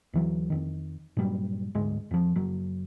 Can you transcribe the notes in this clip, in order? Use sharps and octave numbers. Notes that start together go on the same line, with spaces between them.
D2 E3 F#3
F2 D#3
G2 A#2 F#3 G3
D2 G#2 G#3
F2 F3
F#1 F#3